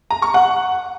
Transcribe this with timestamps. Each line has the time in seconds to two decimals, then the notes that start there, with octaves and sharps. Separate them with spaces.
0.11 A#5
0.22 C#6
0.34 F#5